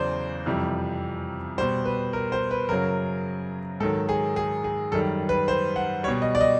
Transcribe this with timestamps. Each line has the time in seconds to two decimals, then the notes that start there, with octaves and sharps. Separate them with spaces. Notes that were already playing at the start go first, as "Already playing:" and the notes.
Already playing: E2 C#3 F#3 C5 D5
0.46 F2 C3 E3 G3
1.58 B2 G3 C5
1.85 B4
2.13 A#4
2.32 C5
2.51 B4
2.69 F#2 C#3 F#3 A#4
3.80 G#2 D#3 F#3 A4
4.09 G#4
4.36 G#4
4.64 G#4
4.92 F#2 D#3 G3 A4
5.29 B4
5.48 C5
5.76 F#5
6.03 G3 C#5
6.08 B2
6.22 D#5
6.35 D5
6.41 D#5